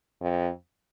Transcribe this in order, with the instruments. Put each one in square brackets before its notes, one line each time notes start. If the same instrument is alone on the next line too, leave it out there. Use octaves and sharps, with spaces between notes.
[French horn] F2